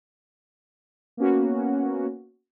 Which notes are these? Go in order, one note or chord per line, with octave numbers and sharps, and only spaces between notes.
A#3 B3 C#4 F#4